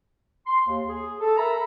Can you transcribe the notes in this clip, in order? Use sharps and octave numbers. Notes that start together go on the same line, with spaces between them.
C6
D#2
G#4
A4
A4 A#4 E5 A#5 B5